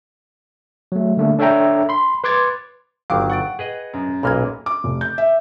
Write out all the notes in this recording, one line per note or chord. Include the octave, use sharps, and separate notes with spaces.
F#3 A3
D3 G3 A3 A#3 D4
D4 A4 C#5 E5 G5 A#5
B5 C6
B4 C6 D6 G#6 A6
G1 D#3 F#3 F5 G5 D6
F#5 C#6 A6 D7
G#4 B4 D#5
F#2
B1 A#2 A#3 B5 F6 G#6
D6
F1
G6
E5